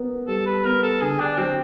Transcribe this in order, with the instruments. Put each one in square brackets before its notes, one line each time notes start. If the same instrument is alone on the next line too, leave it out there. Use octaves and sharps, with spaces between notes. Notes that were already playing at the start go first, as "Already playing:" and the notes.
Already playing: [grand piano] B3 A#4
[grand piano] G3 [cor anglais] A4
[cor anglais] B4
[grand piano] B3 [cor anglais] A#4
[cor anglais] A4
[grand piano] D3 [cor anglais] G#4
[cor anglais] D4
[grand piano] F#3 [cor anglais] C4